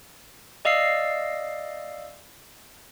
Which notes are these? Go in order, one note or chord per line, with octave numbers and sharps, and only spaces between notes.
D5 D#5 F5 E6 C7